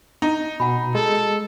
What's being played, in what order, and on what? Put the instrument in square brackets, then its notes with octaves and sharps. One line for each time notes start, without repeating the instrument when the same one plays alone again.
[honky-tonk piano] D#4
[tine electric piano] B2 [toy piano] F#5 G#5 B5
[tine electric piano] G#3 [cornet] A4 [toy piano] A5